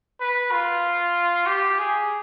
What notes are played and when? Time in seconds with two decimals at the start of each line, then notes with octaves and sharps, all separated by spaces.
0.20 B4
0.52 F4
1.46 G4
1.79 G#4